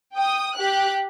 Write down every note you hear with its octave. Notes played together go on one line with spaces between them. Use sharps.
G5 D#6
G4 F#6